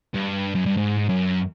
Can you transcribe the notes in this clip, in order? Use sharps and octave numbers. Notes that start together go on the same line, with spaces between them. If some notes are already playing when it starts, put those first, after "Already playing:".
G2
F#2
G2
G#2
F#2